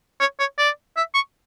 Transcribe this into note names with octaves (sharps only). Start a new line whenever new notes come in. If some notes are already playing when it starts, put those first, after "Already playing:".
C#5
C#5
D5
E5
C#6